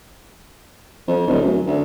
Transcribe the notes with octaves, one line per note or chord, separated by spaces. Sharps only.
F2
D1
F#2
D2